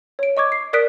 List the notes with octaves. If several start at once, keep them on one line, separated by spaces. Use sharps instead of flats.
C#5 D7
D#5 C#6 D6 G#6
C7
A#4 D5 D#6 F#6 B6 D7